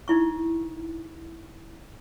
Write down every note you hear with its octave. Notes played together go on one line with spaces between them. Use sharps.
D#4 E4 C#6